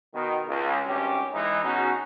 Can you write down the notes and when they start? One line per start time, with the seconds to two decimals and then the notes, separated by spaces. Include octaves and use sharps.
0.15 B2 D#3
0.48 C#2
0.87 G#1 G2 C#4 G4
1.34 E3 G#3 D#4
1.64 B2 C#4 D#4 F#4 G#4